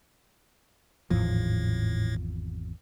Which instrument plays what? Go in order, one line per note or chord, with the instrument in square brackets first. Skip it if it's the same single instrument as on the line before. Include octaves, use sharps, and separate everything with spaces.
[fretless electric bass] G#1 E2 F3 [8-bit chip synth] A2